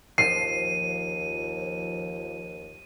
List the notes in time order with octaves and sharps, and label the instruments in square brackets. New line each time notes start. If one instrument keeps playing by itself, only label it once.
[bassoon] D#2 [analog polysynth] F3 [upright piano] C7 [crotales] D#7